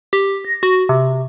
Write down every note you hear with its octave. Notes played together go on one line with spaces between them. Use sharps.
G4
A#6
F#4
C3